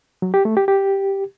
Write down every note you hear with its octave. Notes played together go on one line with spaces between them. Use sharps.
F#3
G4
A3
G4
G4